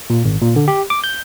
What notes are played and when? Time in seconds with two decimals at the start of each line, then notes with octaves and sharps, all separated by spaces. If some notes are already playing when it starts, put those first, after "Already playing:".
0.10 A#2
0.25 G#1
0.41 A#2
0.56 D3
0.68 G4
0.90 D6
1.04 G6